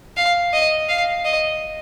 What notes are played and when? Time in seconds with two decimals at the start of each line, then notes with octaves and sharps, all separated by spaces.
0.17 F5
0.53 D#5
0.89 F5
1.25 D#5